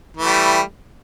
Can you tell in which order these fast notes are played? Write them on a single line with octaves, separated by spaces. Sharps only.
E3 A3 G3